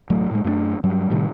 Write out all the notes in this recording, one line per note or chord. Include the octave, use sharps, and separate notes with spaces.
E1 A1 F#3 A3
A2 G#3
F#2 A3 A#3 D4
G2 F#3 G3
A2 C3 D#3 G3